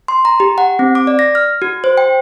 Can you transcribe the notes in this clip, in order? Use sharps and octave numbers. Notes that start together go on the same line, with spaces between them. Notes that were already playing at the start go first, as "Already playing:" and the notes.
C6
A#5
G4
F#5
C4
D6
D5
A#6
F6
F#4
C5
G5